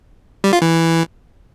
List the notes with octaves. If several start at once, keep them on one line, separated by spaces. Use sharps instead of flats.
G3
F4
E3